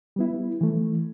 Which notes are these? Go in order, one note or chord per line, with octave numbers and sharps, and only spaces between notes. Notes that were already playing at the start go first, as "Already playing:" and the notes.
G3 B3 E4
E3 A3